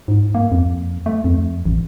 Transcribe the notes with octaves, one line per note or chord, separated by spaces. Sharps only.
G#2
A#3
F2
A3
F2
A1